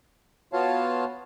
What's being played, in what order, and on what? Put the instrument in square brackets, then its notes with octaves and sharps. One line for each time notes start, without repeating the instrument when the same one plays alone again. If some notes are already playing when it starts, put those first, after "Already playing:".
[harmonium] B3 F4 F#4 C#5 F5 A5